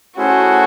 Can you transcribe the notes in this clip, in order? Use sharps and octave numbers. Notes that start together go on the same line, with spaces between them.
A3 C#4 E4 F#4 G#4 C5